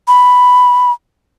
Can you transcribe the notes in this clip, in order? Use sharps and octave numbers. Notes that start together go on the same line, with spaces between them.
B5